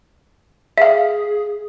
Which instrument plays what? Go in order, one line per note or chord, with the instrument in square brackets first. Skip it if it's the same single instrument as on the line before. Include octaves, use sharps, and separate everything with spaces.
[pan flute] G#4 [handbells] E5 F5